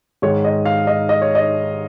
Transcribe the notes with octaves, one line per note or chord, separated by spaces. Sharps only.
G#2 D#3 G#3 C#5
D#5
F5
D#5
D#5
C#5
D#5